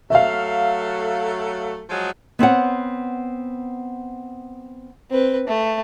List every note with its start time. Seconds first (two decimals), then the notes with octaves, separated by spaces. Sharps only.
0.10 F#3 A3 E5 F5
1.89 F3 F#3 G#3
2.39 B3 C4 C#5 F#5
5.11 C4 B4
5.48 A3